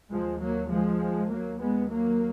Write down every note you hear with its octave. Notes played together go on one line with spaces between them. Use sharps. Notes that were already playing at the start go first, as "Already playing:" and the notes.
D#2 F3 G#3
F#3 A#3
F3 G#3
D#2 F#3 A#3
G#3 B3
F#3 A#3